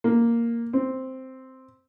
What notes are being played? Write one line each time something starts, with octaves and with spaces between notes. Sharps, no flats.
A#3
C4